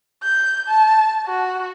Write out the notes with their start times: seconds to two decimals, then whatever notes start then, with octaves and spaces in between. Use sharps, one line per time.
0.23 G6
0.68 A5
1.27 F#4